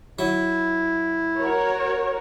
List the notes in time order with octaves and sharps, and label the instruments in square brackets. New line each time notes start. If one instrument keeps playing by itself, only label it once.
[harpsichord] F#3 [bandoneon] E4
[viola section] F#4 A#4 C#5